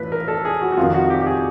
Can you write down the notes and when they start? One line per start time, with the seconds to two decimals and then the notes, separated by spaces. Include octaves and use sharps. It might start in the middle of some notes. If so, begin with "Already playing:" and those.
Already playing: A2 E3 B4
0.12 A#4
0.28 A4
0.45 G#4
0.61 F#4
0.72 F#4
0.77 F2 C3 D#3 F4
0.94 F#4
1.10 G4
1.21 G4
1.26 G#4